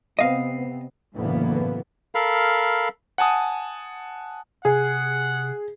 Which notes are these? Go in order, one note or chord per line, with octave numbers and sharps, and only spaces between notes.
C3 B3 C4 D#5 F5
F#1 D2 A2 E3 A#3 B3
A4 A#4 F5 B5
F#5 G#5 A5 D#6
C3 G#4 F#5